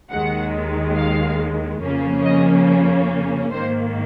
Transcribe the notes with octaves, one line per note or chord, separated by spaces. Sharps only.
D#2 D#3 G#3 F#5
F5
F2 C#3 F3 A#3 C#4
D#5
G#2 D#3 A#3 C5